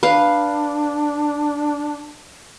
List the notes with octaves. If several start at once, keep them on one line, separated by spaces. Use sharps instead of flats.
D4 B4 F5